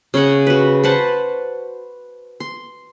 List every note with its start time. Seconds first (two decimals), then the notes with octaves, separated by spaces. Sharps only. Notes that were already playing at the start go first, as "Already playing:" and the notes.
0.14 C#3 C#4 D#5 F#5
0.47 F#4 B4
0.84 B4 C5 F#5 A5
2.40 C6